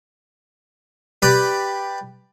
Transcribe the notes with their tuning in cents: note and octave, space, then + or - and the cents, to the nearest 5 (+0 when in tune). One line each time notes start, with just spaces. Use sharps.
G4 +0 B4 +0 D5 +10